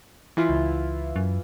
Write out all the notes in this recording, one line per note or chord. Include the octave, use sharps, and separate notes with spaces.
E3 E4 F4
C#2
F#2